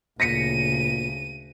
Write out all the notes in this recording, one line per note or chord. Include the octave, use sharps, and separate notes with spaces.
D2 A#2 C#3 A#6 B6 C#7 D#7